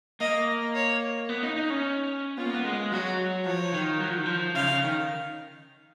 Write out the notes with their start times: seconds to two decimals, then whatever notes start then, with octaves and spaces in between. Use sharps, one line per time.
0.20 A#3 D#5
0.75 C#5
1.29 B3
1.43 D#4
1.56 D#4
1.70 C#4
2.37 B3 F4
2.45 A#3
2.54 B3
2.64 G#3
2.92 F#3 F#4
3.46 F3 C#5
3.73 D#3
4.00 F#3
4.09 F3
4.17 D#3
4.26 F3
4.55 C#3 F5
4.68 C#3
4.82 D#3